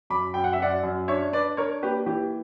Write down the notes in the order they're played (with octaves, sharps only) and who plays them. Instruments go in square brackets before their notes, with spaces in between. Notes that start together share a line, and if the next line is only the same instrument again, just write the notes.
[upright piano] F#2 B5 D6
F#2 G5
F#5
E5
F#2 D5 F#5
F#2
D4 C#5 E5
D4 B4 D5
D4 A#4 C#5
A#3 G4 B4
E3 G4